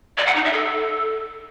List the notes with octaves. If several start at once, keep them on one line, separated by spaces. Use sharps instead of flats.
D5
F#5
D#4
E5
A4